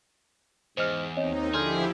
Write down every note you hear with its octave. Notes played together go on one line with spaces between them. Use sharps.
E2 G#2 C5 D#5 F6
D#2 C4 D#4 C#5 D#5
D3 F3 E4 G4 G#4 C6 F6 G6